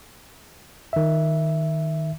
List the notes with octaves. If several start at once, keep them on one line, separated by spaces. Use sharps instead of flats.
D#3 E5